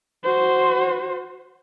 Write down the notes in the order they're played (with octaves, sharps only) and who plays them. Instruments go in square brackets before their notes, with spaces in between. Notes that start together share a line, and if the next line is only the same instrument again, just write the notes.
[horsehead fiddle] F#4 C5